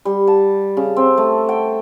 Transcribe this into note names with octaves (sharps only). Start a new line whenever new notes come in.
G3
A5
C#3
C4
A3
G5